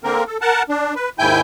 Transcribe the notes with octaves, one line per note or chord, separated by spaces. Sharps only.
D3 A#3 C4 A#4
A4
A#4 F#5 A5
D4
B4
D#2 G#2 E4 G5 G#5 G6